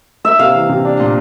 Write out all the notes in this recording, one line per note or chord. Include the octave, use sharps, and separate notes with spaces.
A#3 E5
C3 F5
E3
C3
D4
A#2